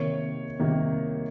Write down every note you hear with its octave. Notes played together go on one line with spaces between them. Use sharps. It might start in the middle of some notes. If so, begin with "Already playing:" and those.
Already playing: C3 D#3 A#3 C#5
C3 D#3 A#3